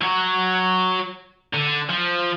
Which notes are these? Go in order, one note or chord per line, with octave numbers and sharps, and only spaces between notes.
F#3 F#4
D3
F3